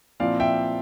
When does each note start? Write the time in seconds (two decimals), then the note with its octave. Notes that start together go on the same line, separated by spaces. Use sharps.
0.20 A#2 F3 C4 E4 D5 F5
0.40 E5 G5